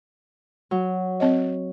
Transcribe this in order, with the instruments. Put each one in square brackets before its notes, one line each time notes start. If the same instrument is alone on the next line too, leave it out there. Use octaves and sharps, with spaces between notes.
[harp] F#3
[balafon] C4 C#5 D#5